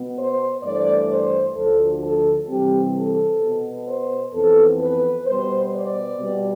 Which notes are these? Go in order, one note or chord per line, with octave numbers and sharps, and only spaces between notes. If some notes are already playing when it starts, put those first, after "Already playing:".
Already playing: B2 B3
C5
G2 E3 A3 D5
C5
D2 D3 F3 A4
A4
C3 E3 G3 C4 G4
A4
B2 B3
C5
F2 E3 B3 A4
B4
B2 G3 B3 C5
D5
B2 G3 B3